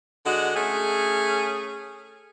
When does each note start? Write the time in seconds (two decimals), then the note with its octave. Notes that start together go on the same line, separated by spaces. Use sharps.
0.26 D3 G#3 F#4
0.56 A3 C#4 G#4